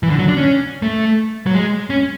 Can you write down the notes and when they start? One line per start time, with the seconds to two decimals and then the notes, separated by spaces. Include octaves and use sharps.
0.03 E3
0.10 D3
0.19 F#3
0.28 D4
0.37 C#4
0.82 A3
1.46 F#3
1.54 G#3
1.90 C#4